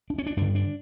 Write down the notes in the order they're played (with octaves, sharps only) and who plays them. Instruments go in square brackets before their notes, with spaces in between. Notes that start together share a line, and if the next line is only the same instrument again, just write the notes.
[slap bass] D4
C#4
D4
G2 D3 D4
D4